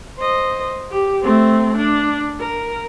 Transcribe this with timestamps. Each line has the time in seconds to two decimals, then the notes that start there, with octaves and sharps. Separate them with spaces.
0.18 C5 D#5
0.91 G4
1.23 A3 C4
1.77 D4
2.39 A#4